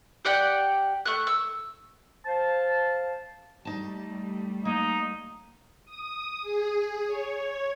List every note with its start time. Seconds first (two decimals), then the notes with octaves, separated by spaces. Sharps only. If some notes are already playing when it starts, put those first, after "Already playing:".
0.25 G4 D5 F#5 G5
1.05 A3 F#6
1.27 E6
2.26 C5 F5 A5
3.65 G3 A3 D#4 A5
4.65 A#3 D#4
5.85 D#6
6.42 G#4
7.07 C#5